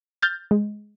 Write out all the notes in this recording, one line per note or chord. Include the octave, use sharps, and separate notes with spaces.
F6 G6 A6
G#3